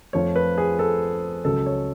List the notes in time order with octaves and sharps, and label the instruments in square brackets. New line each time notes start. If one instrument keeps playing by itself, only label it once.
[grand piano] F2 F3 A3 F4 C#5
B4
G#4
A4
C#2 C#3 F#3 A4
C#5